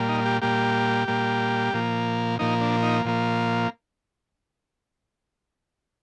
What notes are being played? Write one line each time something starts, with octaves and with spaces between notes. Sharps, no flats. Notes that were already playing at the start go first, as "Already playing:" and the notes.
Already playing: A#2 G3 A#3
D#4
G4
A#2 G3 A#3 G4
A#2 G3 A#3
A#2 F3 A#3
A#2 F3 A#3 D#4
D4
D#4
A#2 F3 A#3